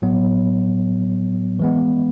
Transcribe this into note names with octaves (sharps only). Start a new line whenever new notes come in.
A2 F#3 B3
E3 G#3 B3